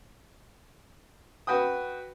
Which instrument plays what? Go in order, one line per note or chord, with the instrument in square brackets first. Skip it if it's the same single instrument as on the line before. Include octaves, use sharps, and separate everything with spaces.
[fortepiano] F#4 B4 G5 D#6